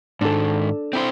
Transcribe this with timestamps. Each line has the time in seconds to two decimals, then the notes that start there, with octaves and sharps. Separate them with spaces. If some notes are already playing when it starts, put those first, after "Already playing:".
0.21 G#2 D#3 D4 A4
0.93 C4 E4 C5